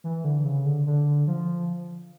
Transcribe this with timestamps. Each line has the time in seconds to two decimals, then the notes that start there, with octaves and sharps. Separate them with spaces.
0.04 E3
0.24 D3
0.45 C#3
0.65 D3
0.87 D3
1.27 F3